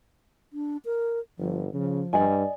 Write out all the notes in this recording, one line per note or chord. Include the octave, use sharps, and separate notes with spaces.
D4
A#4
G1 F3
C#3 F3
G2 D5 D#5 G#5